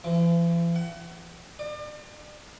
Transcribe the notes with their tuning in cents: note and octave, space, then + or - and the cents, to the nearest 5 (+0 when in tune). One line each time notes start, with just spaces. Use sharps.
E3 +45
F#5 +35
D5 +40